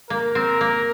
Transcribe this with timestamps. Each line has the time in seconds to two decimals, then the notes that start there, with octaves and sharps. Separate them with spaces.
0.10 A#3 A#4
0.35 C4
0.61 A#3